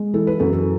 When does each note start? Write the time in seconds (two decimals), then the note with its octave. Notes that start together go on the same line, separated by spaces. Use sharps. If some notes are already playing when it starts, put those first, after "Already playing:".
Already playing: G#3
0.14 E3 A4
0.27 B4
0.39 F#2 A4
0.53 A4